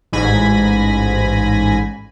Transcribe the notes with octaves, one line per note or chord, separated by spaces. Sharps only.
A1 G#2 G#5 B5 A#6